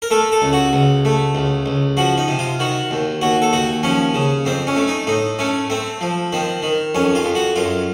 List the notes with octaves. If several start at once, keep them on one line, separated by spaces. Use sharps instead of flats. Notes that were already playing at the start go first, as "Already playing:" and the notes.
A#4
A3 A4
A4
C#2
F#4
C#2
A3
C#2
C#2
F3 F#4
D#4
C3
F4
D#3 F#4
D#2
D#2 F#4
A4
D#2 F#4
F3 C#4
C#3
F2 C4
C#4
A3
D#4
A2 D#4
A3 C#4
A3 C4
F3
D#3 C4
D#3
F2 C#4
F4
F2
F#4
F#2 F4